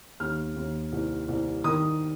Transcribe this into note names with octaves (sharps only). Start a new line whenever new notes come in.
D#2 F6
D#2
C2
C2
D#3 D#6